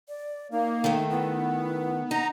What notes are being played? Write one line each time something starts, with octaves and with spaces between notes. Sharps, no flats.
D5
A#3 D#4
D#3 A3
B3 E4
D#4 F#5 A#5